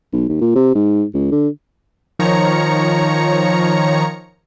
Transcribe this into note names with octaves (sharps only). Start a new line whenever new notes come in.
B1
D#2
A#2
C3
G#2
C#2
D3
D#3 F3 C#5 A#5 C#7